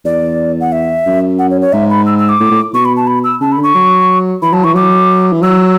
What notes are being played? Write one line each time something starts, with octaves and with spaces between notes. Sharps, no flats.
E2 D5
F#5
E5
F#2
F#5
C#5
C#5
G#2 E5
B5
E6
E6
D6
A2
A2
B2 C#6
B5
A5
B5
E6
C#3 A5
B5
D3
C#6
F#3
E3 B5
F#3 A5
E3 C#6
F#3 D6
E3
F#3 E6